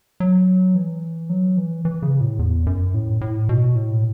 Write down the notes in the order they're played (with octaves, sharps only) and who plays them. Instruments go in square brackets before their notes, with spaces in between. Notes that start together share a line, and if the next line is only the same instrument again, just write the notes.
[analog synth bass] F#3
E3
F#3
E3
E3
C#3
A2
E2
F#2
A2
A2
B2
A2